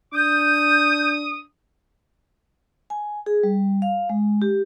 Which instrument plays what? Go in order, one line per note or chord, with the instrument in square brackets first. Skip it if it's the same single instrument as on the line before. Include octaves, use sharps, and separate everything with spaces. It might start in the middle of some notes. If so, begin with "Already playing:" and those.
[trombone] D4 [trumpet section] D#6 [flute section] G6
[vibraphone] G#5
G#4
G3
F5
G#3
G4